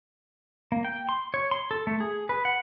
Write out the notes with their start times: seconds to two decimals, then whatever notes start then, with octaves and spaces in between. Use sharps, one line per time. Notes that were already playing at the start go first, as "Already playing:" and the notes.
0.72 A#3
0.85 G5
1.09 C6
1.34 C#5
1.51 C6
1.71 A4
1.87 A3
2.00 G#4
2.29 B4
2.45 F#5